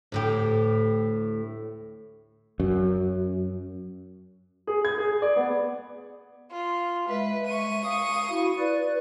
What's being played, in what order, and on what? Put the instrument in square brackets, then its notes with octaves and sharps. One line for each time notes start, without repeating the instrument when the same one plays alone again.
[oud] D2 A2 G4
[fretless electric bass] F#2
[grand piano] G#4
G#6
G#4
D5
B3
[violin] F4
[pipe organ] G#3 E5 [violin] B4
[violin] C#6 D#7
[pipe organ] F5 D#6
E4 F#4
B4 D5